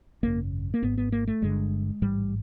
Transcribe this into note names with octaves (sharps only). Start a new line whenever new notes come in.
G#1 F#2 C#3 A#3
A#3
G#1 G#2 B3
B3
A#3
A3
G1 G2 D3 G#3
A1 G#2 G3